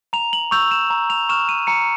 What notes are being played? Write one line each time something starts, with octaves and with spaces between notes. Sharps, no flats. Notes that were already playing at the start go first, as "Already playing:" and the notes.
A#5 F7
F#7
C#6 E6 G6 F7
E7
A#5
F7
C#6 F6 E7
D#7
A#5 C#7